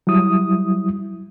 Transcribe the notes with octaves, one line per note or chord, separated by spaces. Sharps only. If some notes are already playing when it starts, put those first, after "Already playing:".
F#3 G3 E4 D#6